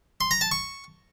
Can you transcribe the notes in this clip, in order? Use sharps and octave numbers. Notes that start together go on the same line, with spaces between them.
C6
A#5
A5
C#6